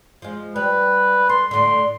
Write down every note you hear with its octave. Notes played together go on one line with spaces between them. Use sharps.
F3 G#3
G3 B4
A4 C6
A2 D3 C6